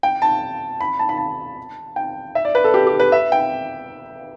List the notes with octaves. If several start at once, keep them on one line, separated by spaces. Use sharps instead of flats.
G5
A5
B5
A5
B5
A5
G5
E5
D5
B4
A4
G4
G4
B4
E5
G5